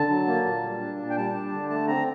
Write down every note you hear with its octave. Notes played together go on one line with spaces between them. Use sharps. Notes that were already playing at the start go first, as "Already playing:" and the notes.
Already playing: D3 A5
F#3
A#3
A#2
G3
D4
A#2
G5
G3 A5
D4
D3
A3 A5
C4 A#5